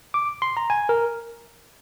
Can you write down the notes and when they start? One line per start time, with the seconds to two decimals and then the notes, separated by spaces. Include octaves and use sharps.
0.14 D6
0.42 C6
0.57 A#5
0.70 G#5
0.89 A#4